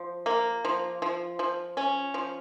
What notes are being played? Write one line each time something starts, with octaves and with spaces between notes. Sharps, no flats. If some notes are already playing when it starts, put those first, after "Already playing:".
Already playing: F3
A#3
F3
F3
F3
C#4
F3